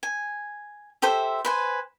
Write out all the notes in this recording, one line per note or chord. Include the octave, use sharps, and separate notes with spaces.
G#5
G4 A4 C5 E5
B4 C5 G#5